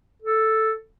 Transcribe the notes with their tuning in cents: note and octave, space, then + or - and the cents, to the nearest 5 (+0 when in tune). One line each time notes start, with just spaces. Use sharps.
A4 +0